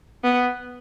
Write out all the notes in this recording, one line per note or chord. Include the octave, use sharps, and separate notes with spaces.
B3